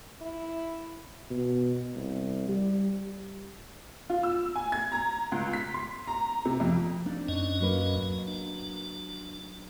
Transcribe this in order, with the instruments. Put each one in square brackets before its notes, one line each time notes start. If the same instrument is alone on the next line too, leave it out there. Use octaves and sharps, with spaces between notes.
[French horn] E4
[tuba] B2
C2
G3
[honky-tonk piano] F4
E6
G#5
G#6
A#5
C#2
B6
C6
A#5
C3
F2
[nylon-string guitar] C4 D4 D#4
[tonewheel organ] F#2 C#4 D#5
[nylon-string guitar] F#3 A#3 B4
[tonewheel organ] D4